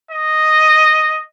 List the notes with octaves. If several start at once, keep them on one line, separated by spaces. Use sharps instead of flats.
D#5